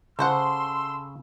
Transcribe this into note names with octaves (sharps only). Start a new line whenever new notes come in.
C#3 A4 C5 F#5 C6 E6